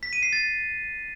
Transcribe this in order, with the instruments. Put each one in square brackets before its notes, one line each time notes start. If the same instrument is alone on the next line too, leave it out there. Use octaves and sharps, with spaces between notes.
[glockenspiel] B6
D#7
C7
A6